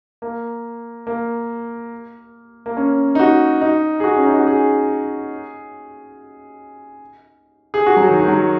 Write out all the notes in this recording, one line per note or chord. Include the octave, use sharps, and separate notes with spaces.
A#3
A#3
A#3
C#4
D#4
F#4
D#4
G#4
F#4
C#4
D#4
F#4
G#4
G#4
F#4
F#3
D#3
D#3
F#3